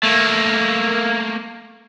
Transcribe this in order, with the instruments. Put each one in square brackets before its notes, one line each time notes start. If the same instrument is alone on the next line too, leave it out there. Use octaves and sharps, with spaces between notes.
[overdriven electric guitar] A3 A#3